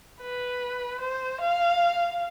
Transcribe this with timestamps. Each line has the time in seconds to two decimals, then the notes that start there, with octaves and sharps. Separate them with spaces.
0.21 B4
1.01 C5
1.41 F5